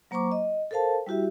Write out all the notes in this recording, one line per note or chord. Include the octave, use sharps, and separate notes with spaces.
F#3 A#3 C5 A#5 C#6 D6
D#5
A4 A#4 C5 F5 A5
G3 E4 F#4 G4 E5